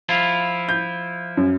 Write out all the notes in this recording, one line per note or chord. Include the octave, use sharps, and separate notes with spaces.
F3 E4 F4
G6
F#2